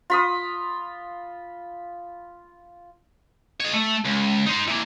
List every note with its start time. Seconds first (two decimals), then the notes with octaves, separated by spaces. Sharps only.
0.10 F4 B5 D#6
3.60 C#5 D#5
3.73 A3
4.05 C#2
4.46 D#4 C5
4.68 E3 A#3